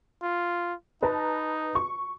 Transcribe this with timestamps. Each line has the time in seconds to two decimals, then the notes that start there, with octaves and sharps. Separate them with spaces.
0.23 F4
1.02 D#4 B4 A5 A#5
1.75 C#6